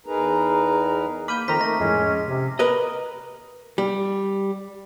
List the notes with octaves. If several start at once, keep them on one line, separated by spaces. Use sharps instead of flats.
E2 D#4 G#4 A#4 B4 A#5
A#3 B5 D6 F6 G6 D#7
F2 D#3 C4 A#4 A#5 B6
D#3 A3 A#6 B6
F2 A2 G#3 C#4
C3
A#4 B4 D#5
G3